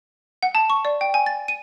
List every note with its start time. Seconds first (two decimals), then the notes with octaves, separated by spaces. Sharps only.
0.43 F#5
0.55 A5
0.70 C#6
0.85 D5
1.01 G5
1.14 G#5
1.26 A6
1.48 D#7